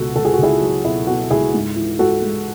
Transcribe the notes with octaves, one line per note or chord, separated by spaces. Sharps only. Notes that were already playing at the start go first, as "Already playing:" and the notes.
Already playing: C#2 B2 F#4 A4
C#2 A4
G#4
F#4
C#2 E4 G#4
F#3
B2 E4
B2 F#4
C#2 E4 G#4
G#2
E3
G#2 F#4 A4
G#3